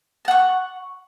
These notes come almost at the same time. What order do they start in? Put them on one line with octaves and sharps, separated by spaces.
A5 F#5 C#6